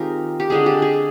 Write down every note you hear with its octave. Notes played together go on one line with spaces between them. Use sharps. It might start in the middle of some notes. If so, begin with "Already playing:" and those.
Already playing: D#3 G#3 C4 D#4 F4 G4 A#4
G4
D3 G#3 C4 G#4
G4
G#4